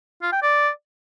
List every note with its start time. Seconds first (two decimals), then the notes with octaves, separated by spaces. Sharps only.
0.22 F4
0.32 G5
0.43 D5